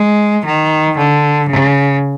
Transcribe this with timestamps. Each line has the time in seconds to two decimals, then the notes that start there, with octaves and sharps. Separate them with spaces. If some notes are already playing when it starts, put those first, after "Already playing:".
Already playing: G#3
0.45 D#3
0.98 D3
1.49 C#3